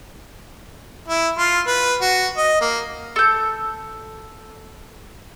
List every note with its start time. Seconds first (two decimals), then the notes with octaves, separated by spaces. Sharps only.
1.08 E4
1.38 F4
1.67 B4
2.01 F#4
2.37 D#5
2.61 A#3
3.16 A4 G6